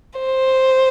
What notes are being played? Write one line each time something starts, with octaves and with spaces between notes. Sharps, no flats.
C5